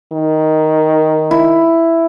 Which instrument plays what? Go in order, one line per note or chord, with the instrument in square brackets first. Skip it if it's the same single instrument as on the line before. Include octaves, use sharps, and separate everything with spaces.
[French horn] D#3
[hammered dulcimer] E4